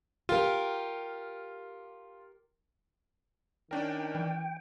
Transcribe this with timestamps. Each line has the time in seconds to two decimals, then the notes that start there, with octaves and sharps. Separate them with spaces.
0.29 F4 G4 A#4
3.71 D#3 C#4 D4 A#4 G5
4.15 E3